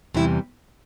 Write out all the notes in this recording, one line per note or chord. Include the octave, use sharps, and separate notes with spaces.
E2 C3 E3 G3 E4